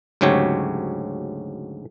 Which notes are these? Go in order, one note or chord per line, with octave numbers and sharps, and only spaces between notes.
D2 G#2 C#3 F#3 G4 C#5